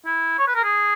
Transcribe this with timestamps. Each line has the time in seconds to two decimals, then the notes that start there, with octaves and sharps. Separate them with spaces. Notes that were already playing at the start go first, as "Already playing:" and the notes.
0.06 E4
0.39 C#5
0.47 B4
0.55 A#4
0.64 G#4